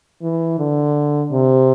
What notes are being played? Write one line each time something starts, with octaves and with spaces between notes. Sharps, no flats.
E3
D3
C3